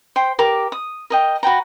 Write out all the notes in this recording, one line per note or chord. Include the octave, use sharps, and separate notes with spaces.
C5 G5
G4 A#4 D6
D#6
A#4 D#5 G5
F#4 B4 G5 A#5